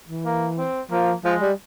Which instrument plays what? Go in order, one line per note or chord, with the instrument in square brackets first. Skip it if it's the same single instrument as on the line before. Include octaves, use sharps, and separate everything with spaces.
[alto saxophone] E3
[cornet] A#3
C4
[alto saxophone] F3 [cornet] A#3
[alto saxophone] F3 [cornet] G#3
[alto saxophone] G3